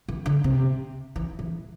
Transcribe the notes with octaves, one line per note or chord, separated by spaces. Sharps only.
E3
D3
C3
E3
E3